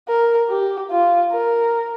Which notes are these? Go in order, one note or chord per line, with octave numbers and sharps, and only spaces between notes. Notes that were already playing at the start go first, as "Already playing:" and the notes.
A#4
G4
F4
A#4